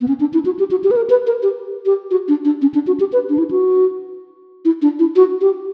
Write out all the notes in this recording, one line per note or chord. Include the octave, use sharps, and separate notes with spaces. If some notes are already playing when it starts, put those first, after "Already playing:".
B3
C#4
D4
E4
F#4
G4
F#4
G4
B4
A#4
B4
A#4
G4
G4
F#4
D4
D4
C#4
D4
F#4
G4
B4
D4
E4
F#4
E4
D4
E4
F#4
G4